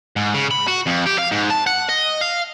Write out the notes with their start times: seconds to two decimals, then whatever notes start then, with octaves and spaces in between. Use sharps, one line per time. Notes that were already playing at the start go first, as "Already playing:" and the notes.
0.16 G#2
0.34 C#3
0.51 B5
0.67 F#4
0.86 F2
1.06 G4
1.18 F5
1.31 G#2
1.50 A5
1.66 F#5
1.89 D#5
2.21 F5